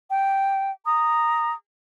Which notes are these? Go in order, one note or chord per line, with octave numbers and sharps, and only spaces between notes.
G5
A#5 D#6